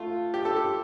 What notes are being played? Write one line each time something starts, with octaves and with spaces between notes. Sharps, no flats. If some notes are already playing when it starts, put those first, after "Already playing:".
Already playing: A3 F4
G4
A4
G4